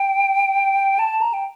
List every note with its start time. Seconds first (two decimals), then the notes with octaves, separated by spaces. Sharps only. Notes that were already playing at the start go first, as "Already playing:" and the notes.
Already playing: G5
0.99 A5
1.21 A#5
1.33 G5